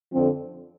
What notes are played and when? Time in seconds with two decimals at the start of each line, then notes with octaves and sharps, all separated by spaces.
0.12 F2 D3 F3 C4